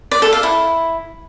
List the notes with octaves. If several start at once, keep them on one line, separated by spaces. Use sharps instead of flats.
D5
A4
F5
E4